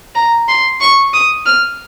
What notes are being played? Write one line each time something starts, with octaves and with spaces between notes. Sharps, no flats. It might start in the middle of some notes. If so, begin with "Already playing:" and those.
A#5
C6
C#6
D#6
F6